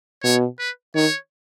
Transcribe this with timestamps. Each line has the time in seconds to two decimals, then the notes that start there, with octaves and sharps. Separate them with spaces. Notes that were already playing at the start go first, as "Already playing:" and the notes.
0.24 B2 C#5
0.59 B4
0.95 D#3 C#5